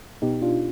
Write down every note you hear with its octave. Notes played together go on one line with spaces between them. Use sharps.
B2 B3 D#4 G4
D4 F4